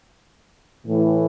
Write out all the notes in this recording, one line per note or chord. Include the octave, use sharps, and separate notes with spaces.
A2 E3